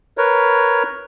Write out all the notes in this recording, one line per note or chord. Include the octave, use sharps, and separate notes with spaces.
A#4 B4 C#5